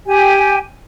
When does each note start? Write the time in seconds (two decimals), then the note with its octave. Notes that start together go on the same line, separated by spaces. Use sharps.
0.07 G4 G#5